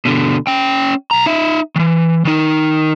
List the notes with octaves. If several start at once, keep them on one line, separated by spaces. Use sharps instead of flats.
B2 D3
C#4 G5
B1 A#5
D#4 E5
D#3 E3
D#3 D#4